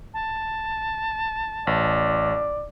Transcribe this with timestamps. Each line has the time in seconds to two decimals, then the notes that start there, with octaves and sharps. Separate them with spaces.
0.14 A5
1.67 A1 D5